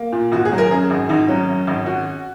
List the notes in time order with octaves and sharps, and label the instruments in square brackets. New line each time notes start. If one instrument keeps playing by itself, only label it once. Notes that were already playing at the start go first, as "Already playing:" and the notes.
Already playing: [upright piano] A#3
A#2
[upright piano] G#1 [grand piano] F#4
[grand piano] G#4
[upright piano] F#3
[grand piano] A#4
[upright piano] F#2 [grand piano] G#4
[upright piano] G#1
[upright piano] G#1 [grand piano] D#4
[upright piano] F#3 [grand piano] C#4
[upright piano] F#2
G#1
F#4